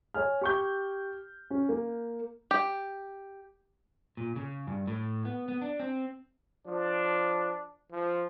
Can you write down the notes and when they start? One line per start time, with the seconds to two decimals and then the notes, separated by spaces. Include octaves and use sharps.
0.14 C#5 G#5 F6
0.41 G4 C#6 G6
1.51 C#4
1.69 A#3
2.51 G4
4.17 A#2
4.36 C#3
4.67 G2
4.87 A2
5.25 B3
5.48 B3
5.62 D4
5.80 C4
6.66 F3 D4
7.92 F3